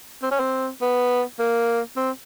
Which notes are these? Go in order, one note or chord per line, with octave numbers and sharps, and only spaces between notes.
C4
C#4
C4
B3
A#3
C4